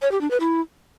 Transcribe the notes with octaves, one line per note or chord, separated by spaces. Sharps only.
C#5
G4
D4
B4
E4